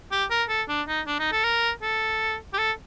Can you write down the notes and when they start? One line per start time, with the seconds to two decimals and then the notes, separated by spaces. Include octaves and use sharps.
0.12 G4
0.30 A#4
0.49 A4
0.69 D4
0.88 D#4
1.07 D4
1.20 D#4
1.32 A4
1.44 A#4
1.83 A4
2.54 G4
2.58 A4